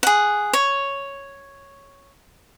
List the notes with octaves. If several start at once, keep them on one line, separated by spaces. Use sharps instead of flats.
G#4 F#5
C#5